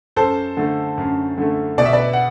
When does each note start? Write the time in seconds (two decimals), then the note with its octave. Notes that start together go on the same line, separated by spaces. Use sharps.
0.16 F#2 A4 C5
0.57 D3 A3
0.98 F#2
1.38 D3 A3
1.78 B2 D5
1.86 E5
1.93 B4 D5
2.13 F#5